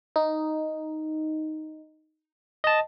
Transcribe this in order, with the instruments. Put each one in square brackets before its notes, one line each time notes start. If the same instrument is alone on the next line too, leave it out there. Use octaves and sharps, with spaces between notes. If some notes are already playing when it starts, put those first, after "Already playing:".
[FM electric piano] D#4
[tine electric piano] D#5 A5